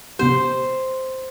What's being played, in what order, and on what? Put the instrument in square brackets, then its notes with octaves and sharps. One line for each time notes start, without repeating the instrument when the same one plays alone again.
[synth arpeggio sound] C3 B3 G4 [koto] C5